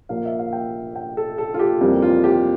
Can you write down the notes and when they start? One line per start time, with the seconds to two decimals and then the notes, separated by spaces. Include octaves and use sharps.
0.09 A#2 F3 A#3 F5
0.25 E5
0.39 F5
0.53 G5
0.95 G5
1.17 A4
1.38 A4
1.54 F4
1.59 G4
1.81 F2 E3 G3 A#3 G4
2.02 F4
2.24 G4